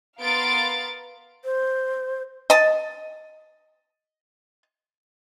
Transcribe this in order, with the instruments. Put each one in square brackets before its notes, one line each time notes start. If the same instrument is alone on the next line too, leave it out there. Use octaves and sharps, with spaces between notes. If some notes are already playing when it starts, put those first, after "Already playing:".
[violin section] B3 A#4 F5 C6 A6 D7
[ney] C5
[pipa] D#5 A5